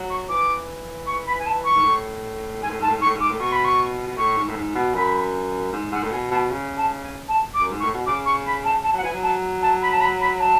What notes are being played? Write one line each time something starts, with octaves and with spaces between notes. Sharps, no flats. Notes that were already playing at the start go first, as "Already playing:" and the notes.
Already playing: F#3
C#6
E3 D6
C#6
B5
G#5
A5
C#6
G#2
A2
G#2 G#5
A2
G#2 A5
A2
G#2
C#6
A2
G#2 D6
A2
B2 C#6
B5
C#6
B2
A2 C#6
G#2
A2
G#2
B2
F#2 B5
G#2
G#2 F#5
A2
B2 G#5
B2 A5
C#3
A5
G#5
A5
D6
F#2
G#2
C#6
A2
B2
C#3 D6
C#6
B5
A5
A5
F#3 F#5
E3 G#5
F#3
A5
A5
B5
A5
B5
B5
A5